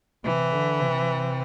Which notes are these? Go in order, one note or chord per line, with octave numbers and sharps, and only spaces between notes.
C3 E3
D3
C3